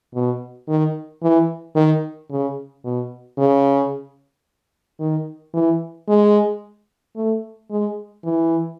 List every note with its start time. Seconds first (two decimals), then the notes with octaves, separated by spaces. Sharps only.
0.14 B2
0.68 D#3
1.22 E3
1.75 D#3
2.30 C#3
2.84 B2
3.38 C#3
5.00 D#3
5.54 E3
6.08 G#3
7.16 A3
7.70 G#3
8.24 E3